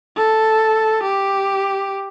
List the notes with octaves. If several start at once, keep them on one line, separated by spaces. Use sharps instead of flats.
A4
G4